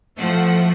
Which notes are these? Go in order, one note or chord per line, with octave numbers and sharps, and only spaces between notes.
A2 F3 A3 F#5